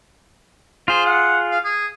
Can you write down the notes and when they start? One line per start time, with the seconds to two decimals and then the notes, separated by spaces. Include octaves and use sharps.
0.88 F4 G#4 C5
1.05 F#5
1.51 F5
1.64 G#4